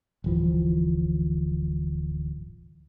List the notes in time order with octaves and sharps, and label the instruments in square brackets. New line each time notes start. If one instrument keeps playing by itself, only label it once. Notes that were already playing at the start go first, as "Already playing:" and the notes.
[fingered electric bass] D1 G1 E3 F3